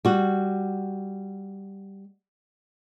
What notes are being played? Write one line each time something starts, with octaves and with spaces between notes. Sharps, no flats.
G3 F#4